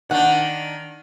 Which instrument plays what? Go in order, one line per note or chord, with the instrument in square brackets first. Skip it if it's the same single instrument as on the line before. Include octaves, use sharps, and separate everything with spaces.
[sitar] D#3 D4 [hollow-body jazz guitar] F#5